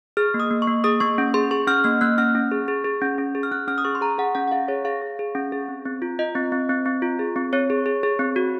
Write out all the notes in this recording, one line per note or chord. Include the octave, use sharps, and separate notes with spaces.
G#4 F6
A#3
D#6
A#3
C#6
A#3
G#4 D#6
A#3 C#6
C#4
G#4 C6
G#4 C#6
C#4 F6
A#3 F6
A#3 F#6
C#4 F6
C#4
G#4
G#4
G#4
C#4
C#4
G#4
F6
C#4 F#6
C#4 F6
D#6
G#4 C#6
C6
G#4 A#5
G#4 F#5
C#4 F#5
F#5
G#4 F5
G#4 C#5
G#4 F5
G#4
G#4
C#4
G#4
C4
C4
F4
F4 D#5
C4
C4
C4
C4
F4
G#4
C4
C4 C#5
G#4
G#4
G#4
C4
F#4